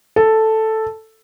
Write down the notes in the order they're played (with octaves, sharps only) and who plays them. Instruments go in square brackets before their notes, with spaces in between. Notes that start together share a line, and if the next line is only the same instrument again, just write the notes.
[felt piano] A4